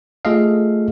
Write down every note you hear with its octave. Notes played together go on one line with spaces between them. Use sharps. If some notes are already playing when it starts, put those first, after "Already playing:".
A3 F4 G#4 A4 D#5 F5